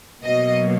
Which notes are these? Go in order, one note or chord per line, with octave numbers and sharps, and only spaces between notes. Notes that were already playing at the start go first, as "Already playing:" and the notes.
B2 F#3 A#3 D#5